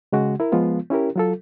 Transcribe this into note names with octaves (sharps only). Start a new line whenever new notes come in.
C#3 G#3 F#4
E4 A#4
F3 G#3 B3 F4
C#4 E4 G4 A#4
F#3 F4 A4